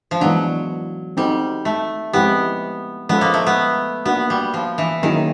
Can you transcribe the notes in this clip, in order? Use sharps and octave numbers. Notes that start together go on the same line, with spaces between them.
F3
E3 F#3 G#3 B3 D4
G3 C4 D#4 F#4 A4 C5
A3
F3 G#3 B3 C4 E4 G4
F3 G#3 B3 C#4 F4 A4
A#3
A3
B3
A#3 B3 D4 F#4
G3
F3
E3
D#3 F#3 A#3 C#4 E4 G#4